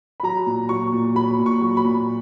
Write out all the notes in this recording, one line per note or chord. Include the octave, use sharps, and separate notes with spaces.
B5
F#3 A#5
A#2
F#3 C#6
A#2
F#3 B5
A#2
C#6
F#3
B5
A#2